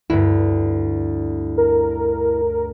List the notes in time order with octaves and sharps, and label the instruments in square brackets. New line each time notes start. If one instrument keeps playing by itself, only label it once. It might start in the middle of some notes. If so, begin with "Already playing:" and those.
[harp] D2 G2 [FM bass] E4
[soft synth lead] A#4